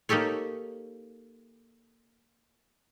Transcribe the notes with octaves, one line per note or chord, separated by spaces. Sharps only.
A#3 D#4 G4 A4 C#5